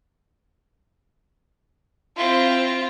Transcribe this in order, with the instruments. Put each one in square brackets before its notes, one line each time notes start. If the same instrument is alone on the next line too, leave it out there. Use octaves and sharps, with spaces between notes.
[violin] C4 E4 [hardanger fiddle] F4